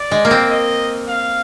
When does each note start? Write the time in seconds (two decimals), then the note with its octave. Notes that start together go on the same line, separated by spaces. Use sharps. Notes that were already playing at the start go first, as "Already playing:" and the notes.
Already playing: D5
0.11 G#3
0.25 A#3
0.31 C4
0.50 D#5
1.08 F5